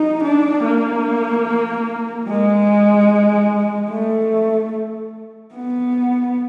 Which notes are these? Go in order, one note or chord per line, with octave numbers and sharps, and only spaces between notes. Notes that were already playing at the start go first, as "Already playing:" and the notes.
Already playing: D#4
D4
A#3
G#3
A3
B3